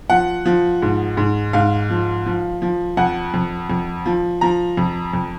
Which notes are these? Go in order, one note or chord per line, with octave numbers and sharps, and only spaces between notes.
F3 F#5
F3
G#2
G#2
G#2 F5
F3
F3
F3
F2 F#5
F2
F2
F3
F3 A#5
F2
F2